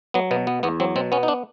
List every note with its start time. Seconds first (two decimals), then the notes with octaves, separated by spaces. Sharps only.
0.14 F#3 B3
0.31 B2 B3
0.47 B3
0.63 E2 B3
0.80 F#3 C4
0.96 B2 C4
1.12 B3 C#4
1.23 D#4
1.28 D4